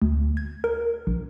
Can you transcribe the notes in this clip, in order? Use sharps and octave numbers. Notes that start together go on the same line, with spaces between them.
D2
G#6
A#4
A#1